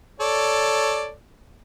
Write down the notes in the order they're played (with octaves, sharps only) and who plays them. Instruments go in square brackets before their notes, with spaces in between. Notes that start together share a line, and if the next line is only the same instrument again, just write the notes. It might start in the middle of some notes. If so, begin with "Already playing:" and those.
[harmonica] A4 C#5 D5